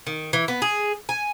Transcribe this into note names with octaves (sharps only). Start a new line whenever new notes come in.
D#3
E3
B3
G#4
G#5